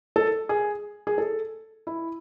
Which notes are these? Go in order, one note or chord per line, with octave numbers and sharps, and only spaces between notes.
A4
G#4
G#4
A4
E4